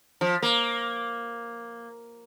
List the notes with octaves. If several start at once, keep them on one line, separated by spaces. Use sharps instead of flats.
F3
A#3